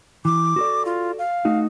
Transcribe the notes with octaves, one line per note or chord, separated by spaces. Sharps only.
E3 D6
F#4 A4 D5
F4
F5
A3 D#4 F#4